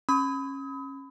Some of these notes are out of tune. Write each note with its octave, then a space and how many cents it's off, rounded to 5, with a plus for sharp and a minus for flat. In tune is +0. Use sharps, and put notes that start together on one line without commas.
C#4 -20 B5 +25 D#6 +35